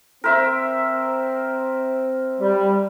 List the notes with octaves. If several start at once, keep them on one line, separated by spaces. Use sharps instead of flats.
C4 A#4 C5 E5
G3